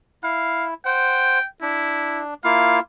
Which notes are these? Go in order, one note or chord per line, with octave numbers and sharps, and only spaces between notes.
E4 F5
C5 F#5 G5
D4 E4
A#3 E4 F4 F5